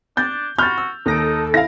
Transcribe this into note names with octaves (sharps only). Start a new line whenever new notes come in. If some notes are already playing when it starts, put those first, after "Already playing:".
D4 G6 A6
F#4 B5 C6 F6 G6 A6
E6
D#2 D#4 A4 A#6 D7
E4 F5 A#6